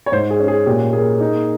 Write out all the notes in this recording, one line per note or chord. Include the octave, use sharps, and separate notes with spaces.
C#5
G#2 C5
G#4
C#4
G#4
A#2 G4
A#3 G#4
D#4